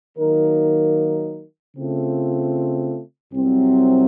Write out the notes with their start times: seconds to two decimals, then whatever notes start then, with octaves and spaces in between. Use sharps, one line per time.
0.18 D#3 F#3 A#3 D#4 A#4
1.76 C#3 A3 C4 F4
3.33 C2 C3 F#3 C4